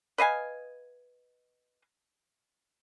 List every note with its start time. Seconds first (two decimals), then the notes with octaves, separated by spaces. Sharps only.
0.18 B4 D#5 F5 G#5